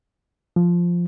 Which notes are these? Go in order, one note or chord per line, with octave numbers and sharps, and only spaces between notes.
F3